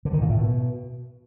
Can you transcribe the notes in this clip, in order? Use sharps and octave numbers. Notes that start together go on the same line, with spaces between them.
D3
D#3
A#2
A2
B2